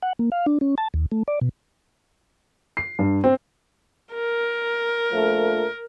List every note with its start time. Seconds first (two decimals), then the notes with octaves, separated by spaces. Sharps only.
0.02 F#5
0.19 A#3
0.32 F5
0.46 D4
0.61 C#4
0.78 A5
0.94 D#2
1.12 A3
1.28 D5
1.41 B2
2.77 C7
2.99 G2
3.24 C4
4.14 A#4
5.12 A#1 F3 A3